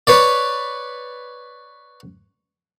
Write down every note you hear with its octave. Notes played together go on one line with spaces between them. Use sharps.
B4 C#5 D5